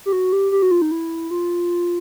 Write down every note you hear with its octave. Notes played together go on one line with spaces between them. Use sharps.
G4
F#4
G4
G4
F#4
F4
D#4
E4
F4